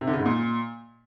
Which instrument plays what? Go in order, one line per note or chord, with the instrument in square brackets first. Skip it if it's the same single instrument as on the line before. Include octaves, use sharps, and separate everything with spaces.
[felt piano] C3
D3
C#3
G#2
A#2